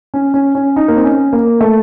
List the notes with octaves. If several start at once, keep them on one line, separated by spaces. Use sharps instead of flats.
C#4
C#4
C#4
D#4
A#3
C4
C#4
A#3
A3